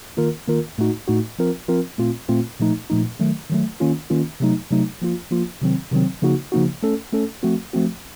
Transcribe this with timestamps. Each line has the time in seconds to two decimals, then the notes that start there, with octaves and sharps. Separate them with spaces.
0.17 D#3 A#3 F4 A#4
0.48 D#3 A#3 F4 A#4
0.78 A2 A3 D#4 F#4
1.08 A2 A3 D#4 F#4
1.39 F3 C4 F4 A#4
1.68 F3 C4 F4 A#4
1.98 A#2 A3 C4 F4
2.29 A#2 A3 C4 F4
2.60 A#2 F3 A3 D#4
2.90 A#2 F3 A3 D#4
3.20 D#3 F#3 A3
3.50 D#3 F#3 A3
3.80 D#3 A#3 C#4 F4
4.10 D#3 A#3 C#4 F4
4.40 C3 F#3 A3 D#4
4.70 C3 F#3 A3 D#4
5.02 F3 A#3 F4
5.31 F3 A#3 F4
5.61 C3 D#3 F#3 C4
5.91 C3 D#3 F#3 C4
6.22 C#3 F3 A#3 D#4 F#4
6.52 C#3 F3 A#3 D#4 F#4
6.82 A3 C#4 A4
7.12 A3 C#4 A4
7.43 F3 A3 C4 F#4
7.73 F3 A3 C4 F#4